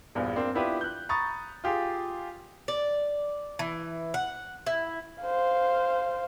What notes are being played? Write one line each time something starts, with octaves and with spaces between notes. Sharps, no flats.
A#1 E2 G2
A#3 C4 D4
B3 D4 E4 F4 G4 B4
F#6 G6
A#5 B5 C#6 D#6 A6
F4 G4 G#4
D5
E3
F#5
E4
C5 F5